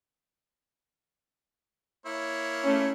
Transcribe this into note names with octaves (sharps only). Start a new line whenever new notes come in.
A#3 E4 C#5
A3 C#4